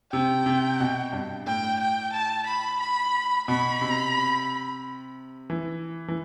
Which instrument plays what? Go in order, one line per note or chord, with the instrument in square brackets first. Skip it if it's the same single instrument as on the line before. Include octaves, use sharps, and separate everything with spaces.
[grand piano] C3 [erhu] G5
[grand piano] C3
B2
G2
[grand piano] A2 [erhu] G5
[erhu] G5
A5
B5
B5
[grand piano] B2 [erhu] B5
[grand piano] C3
E3
E3